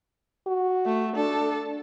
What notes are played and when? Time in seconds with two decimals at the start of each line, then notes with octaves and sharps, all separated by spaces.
0.47 F#4
0.86 A3
1.16 D4 A4